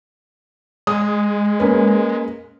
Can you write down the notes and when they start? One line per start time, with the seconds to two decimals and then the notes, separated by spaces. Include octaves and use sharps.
0.87 G#3 D#6
1.60 A#3 C#4 B4